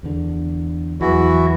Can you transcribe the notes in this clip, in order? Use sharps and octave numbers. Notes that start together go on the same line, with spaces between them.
E2 D3
E2 E3 F#3 E4 F#4